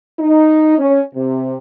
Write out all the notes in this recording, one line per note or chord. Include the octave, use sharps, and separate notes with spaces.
D#4
C#4
C3